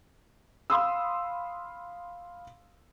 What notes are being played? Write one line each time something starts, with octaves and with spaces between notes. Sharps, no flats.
F5 B5 C6 D#6 E6